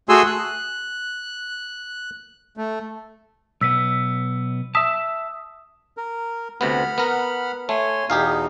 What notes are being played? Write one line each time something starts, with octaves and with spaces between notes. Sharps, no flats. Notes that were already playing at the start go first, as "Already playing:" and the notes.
A3 F#4 G#4 G#5 C6 E6
F#6
A3
B1 B3 E6 B6
E5 A5 D#6 E6 B6
A#4
D2 C3 B3 F#5 B5 F6
B3 A#4
A3 C#5 G#5 C6
E2 B2 D#4 G4 G#4 F5